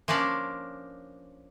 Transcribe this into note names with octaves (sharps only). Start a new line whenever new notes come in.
F3 A#3 C#4 D4 D5